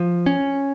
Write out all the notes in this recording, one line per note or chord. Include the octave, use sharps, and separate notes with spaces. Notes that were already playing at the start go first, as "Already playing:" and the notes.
Already playing: F3
C#4